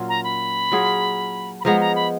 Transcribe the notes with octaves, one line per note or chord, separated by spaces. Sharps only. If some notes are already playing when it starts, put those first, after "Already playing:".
Already playing: A#2 F#3 C#4 F4
A#5
B5
F#3 A#3 F4 G#4
B5
F3 G#3 B3 A#5
A#5
B5